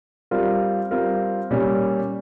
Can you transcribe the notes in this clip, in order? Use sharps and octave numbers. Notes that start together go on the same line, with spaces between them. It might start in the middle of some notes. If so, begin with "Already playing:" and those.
G3 C4 F4 A#4
G3 C4 F4 A#4
A#2 G3 C#4